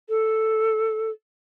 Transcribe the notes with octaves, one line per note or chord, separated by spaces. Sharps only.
A4